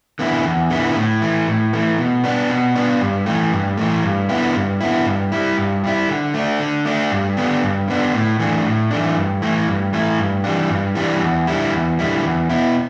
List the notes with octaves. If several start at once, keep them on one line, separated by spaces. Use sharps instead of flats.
D3 B3 E4
E2
D3 B3 E4
A2
E3 A3
A2
E3 A3
B2
B3 D4
B2
B3 D4
G2
E3 A3
G2
E3 A3
G2
D3 B3 E4
G2
D3 B3 E4
G2
G3 E4
G2
G3 E4
D3
A3 D4
D3
A3 D4
G2
D3 B3 D4
G2
D3 B3 D4
A2
E3 A3 D4
A2
E3 A3 D4
G2
E3 A3 E4
G2
E3 A3 E4
G2
E3 G3 D4
G2
E3 G3 D4
E2
D3 G3 E4
E2
D3 G3 E4
E2
B2 B3 E4